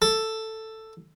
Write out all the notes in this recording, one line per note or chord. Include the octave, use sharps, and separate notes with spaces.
A4